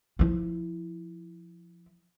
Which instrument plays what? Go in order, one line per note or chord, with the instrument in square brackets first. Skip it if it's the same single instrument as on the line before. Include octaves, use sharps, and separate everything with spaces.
[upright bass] F3 E4